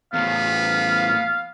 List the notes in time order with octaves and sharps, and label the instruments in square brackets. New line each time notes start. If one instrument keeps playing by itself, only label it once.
[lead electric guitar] E2 A2 [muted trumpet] B3 [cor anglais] F5